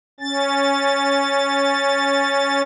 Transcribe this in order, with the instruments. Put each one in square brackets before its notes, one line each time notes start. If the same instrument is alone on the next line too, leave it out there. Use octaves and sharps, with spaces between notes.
[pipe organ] C#4 A6